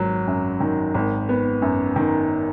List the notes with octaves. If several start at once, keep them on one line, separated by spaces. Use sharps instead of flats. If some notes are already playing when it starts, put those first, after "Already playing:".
Already playing: G#1 F#3
F#2
D#3
G#1
B3
F#2
D#3